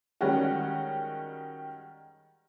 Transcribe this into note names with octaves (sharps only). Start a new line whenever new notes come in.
D#3 G3 G#3 C#4 F#4